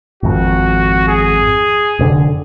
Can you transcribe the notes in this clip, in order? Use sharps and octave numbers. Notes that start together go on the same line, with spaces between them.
G#1 F2 F#4
G#4
F1 A#2 D3